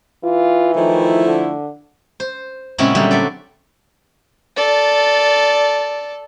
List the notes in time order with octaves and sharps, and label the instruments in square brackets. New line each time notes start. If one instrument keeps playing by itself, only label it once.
[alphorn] E3 [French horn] F4
[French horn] D#3 [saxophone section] F3 A3 E4
[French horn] D3
[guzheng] C5
A#2 C#3 G#3 C4 E4 F#4
D3 F#3 G3
A3 A4 D5
[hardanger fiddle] A4 D5